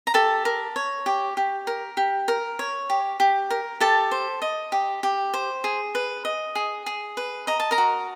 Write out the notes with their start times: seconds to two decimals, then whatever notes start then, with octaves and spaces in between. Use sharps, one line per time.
0.07 A#5
0.14 G4 A4 A5
0.45 A#4
0.76 C#5
1.06 G4
1.37 G4
1.67 A#4
1.97 G4
2.28 A#4
2.59 C#5
2.90 G4
3.20 G4
3.50 A#4
3.80 G4 A4 A5
4.11 C5
4.42 D#5
4.72 G4
5.03 G4
5.34 C5
5.64 G#4
5.95 B4
6.25 D#5
6.55 G#4
6.86 G#4
7.17 B4
7.47 D#5 A#5
7.60 A5
7.71 A#4 A#5
7.78 F#4